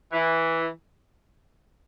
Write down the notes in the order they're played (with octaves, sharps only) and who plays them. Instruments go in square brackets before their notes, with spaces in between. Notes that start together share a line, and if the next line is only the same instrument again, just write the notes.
[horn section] E3